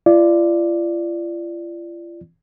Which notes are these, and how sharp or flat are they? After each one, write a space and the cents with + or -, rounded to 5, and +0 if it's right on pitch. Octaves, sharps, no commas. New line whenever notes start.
F4 -40 D5 +5